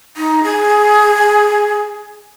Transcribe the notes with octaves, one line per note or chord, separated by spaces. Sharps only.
D#4
G#4